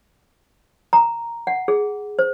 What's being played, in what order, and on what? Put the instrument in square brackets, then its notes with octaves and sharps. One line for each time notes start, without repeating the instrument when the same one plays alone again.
[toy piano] A#5
F#5
G#4
C5